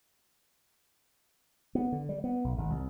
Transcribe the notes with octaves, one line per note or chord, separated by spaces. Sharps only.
B3
D3
G3
B3
B1
G#1
C2